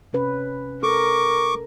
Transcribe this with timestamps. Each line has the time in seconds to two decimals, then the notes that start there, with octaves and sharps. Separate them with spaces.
0.13 C3 C#4 B4
0.83 A4 A#4 C#6 D6